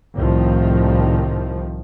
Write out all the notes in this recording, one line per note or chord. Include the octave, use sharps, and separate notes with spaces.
C2 A2 D#3 F3